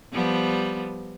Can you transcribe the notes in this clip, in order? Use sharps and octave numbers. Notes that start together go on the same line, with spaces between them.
F3 G3 B3